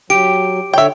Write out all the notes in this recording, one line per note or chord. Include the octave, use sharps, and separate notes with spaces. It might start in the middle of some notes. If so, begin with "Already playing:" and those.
F#3 G4 D7
D3 C#5 E5 G5